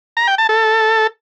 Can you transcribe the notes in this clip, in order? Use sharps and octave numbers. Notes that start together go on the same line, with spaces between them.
A#5
G5
A5
A4